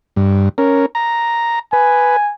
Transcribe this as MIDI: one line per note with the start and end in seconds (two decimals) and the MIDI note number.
0.16 0.49 43
0.58 0.86 61
0.58 0.86 70
0.95 1.59 82
1.73 2.16 71
1.73 2.32 80